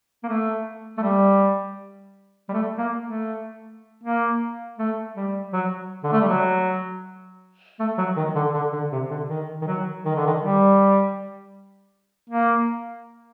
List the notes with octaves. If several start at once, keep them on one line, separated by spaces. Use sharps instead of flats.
A#3
A3
A3
G3
G3
A3
A#3
A3
A#3
A3
G3
F#3
D3
A3
G3
F#3
A3
F#3
D#3
D3
D3
D3
C3
D3
D#3
D#3
F#3
D#3
D3
D#3
G3
A#3